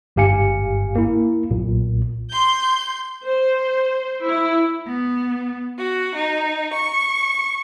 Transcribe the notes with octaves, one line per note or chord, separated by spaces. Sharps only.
G1 G#2 G4 F5 G#5 C#7
A#3 E4
B1 A#2
C6 G6
C5
E4
B3
F#4
D#4
C#6